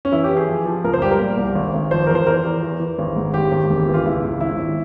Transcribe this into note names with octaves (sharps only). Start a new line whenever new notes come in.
C#4
E3 E4
G4
E3
G#4
F3
F3
C#2 A#4
C5
G3 G4
A#4
A#2
C2
G#1
G#1
F3 C5
E2 A#4
C5
E2 A#4
E2
E3
E3
G#1
G#2
G#1 G4
G#1
E1
E3
F4
C#2 E4
C#2
G#1 E4
G#1